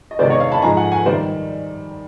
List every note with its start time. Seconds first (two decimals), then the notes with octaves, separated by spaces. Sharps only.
0.11 D#5
0.19 E2 C3 D#3 G#3 C5 D5
0.30 C#5 D#5
0.40 D#5 F5
0.52 A5 B5
0.62 G#2 F3 G#3 G#5 A#5
0.77 F#5 G#5
0.92 F#5 G#5
1.06 D#3 G3 C5 D5